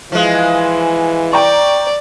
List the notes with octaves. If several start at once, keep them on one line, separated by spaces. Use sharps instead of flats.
E3 F3 G#3
D5 G5 A#5 C#6